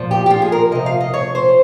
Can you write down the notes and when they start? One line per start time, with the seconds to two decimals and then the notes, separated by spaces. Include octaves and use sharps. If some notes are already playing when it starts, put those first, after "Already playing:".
Already playing: A#2 F3
0.11 G4
0.26 G4
0.31 F4
0.42 G#4
0.52 A#4
0.72 C3 F3 D#5
0.86 F5
1.01 D#5
1.14 C#5
1.35 C5